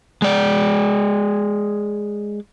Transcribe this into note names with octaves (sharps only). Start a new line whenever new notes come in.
G#3 D5